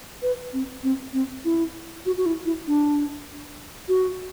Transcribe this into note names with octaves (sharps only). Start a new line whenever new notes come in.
B4
C4
C4
C4
E4
F#4
F#4
E4
E4
D4
F#4